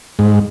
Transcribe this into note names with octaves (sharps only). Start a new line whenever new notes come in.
G#2